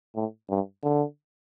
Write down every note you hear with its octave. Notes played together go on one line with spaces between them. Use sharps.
A2
G2
D3